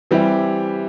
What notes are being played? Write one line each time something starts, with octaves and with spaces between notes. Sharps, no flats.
E3 G3 C4 E4 G4